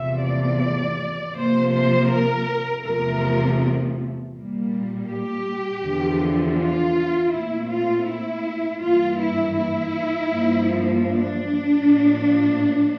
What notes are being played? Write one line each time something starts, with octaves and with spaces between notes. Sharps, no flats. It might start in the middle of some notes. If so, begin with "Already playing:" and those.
Already playing: E2 C3 F3 A3 E5
D5
C3 F3 A#3 C5
C5
A#4
E2 C3 F3 A3 A#4
A#2 G3 A#3
G4
E2 D3 F3
F4
A#2 A3 C4 E4
F4
E4
G2 E3 A#3 F4
E4
E4
G2 F3 A#3
D4
A2 F3 A#3